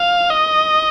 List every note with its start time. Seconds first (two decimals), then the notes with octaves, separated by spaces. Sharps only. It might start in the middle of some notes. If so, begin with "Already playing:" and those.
Already playing: F5
0.31 D#5